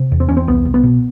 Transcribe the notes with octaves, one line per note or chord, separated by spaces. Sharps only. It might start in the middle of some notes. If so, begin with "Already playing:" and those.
Already playing: C3
E2
C4
E2 C#4
C4
C2 B3
C2
B3
B2